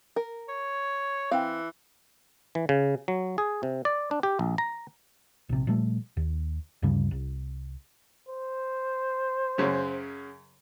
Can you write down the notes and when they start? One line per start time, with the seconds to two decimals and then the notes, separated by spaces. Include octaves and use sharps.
0.16 A#4
0.48 C#5
1.31 E3 C4 F5
2.55 E3
2.69 C#3
3.08 F#3
3.38 G#4
3.63 C3
3.85 D5
4.11 D4
4.23 G4
4.39 A#1
4.58 A#5
5.49 A#1 C3
5.67 A#2 F3 G3 A3
6.17 D#2
6.82 D2 G2 C#3 G3
7.11 C2
8.29 C5
9.58 F#2 C#3 F#3